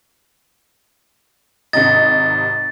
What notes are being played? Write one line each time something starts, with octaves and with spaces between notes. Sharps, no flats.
G#1 C3 D#5 A6